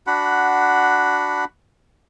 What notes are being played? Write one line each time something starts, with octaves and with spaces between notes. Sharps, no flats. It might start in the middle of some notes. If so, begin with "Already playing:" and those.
D4 F#4 F#5 B5